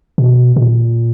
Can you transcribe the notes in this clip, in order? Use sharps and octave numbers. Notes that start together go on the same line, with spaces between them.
B2
B2
A#2